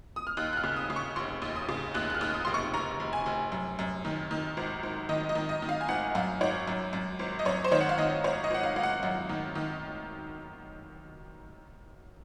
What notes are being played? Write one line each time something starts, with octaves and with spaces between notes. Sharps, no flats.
D#6
F6
D#2 F#6
F#6
F6
C#3
D#6
C#3
C#6
F1 C6
D#2
D#6
C#3
D#2 F#6
F#6
F6
D#2
D#6
F1 C6
C#6
F1 A#5
F1
G#5
F1
F#2
F#2
D#3
D#3
G#1
G#1
D#3 D#5
D#5
D#3
D#5
D#3
F5
G#5
G#1 F#5
F#2 F5
G#1 C#5
F#2
F#2
G#1
D#5
F#2 C#5
C5
D#3 C#5
F#5
F5
D#3 D#5
G#1 C#5
D#5
G#1 F#5
F5
G#1 F5
F#5
F#2
D#3
D#3